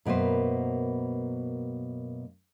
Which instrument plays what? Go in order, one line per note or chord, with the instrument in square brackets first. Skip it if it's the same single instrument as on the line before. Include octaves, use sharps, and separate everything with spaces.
[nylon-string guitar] F#2 B2 A#3 B4 C5